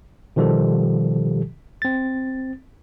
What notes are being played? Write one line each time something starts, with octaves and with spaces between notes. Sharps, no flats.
B2 D#3 F3 G3 G4 A4
C4 A6